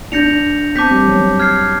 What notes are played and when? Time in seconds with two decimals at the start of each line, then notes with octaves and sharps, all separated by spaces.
0.12 D4 G6 A#6 C#7 F7
0.75 C4 A5 D6 G6 B6
0.91 G3
1.08 F#3
1.40 F6 G#6 C7